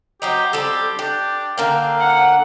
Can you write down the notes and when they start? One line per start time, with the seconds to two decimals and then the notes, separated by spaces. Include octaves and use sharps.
0.22 F#3 C4 D#4 G4
0.53 G3 C4 G4 A4
0.99 D4 G4
1.58 D3 A#3 F5 G5
1.98 F#5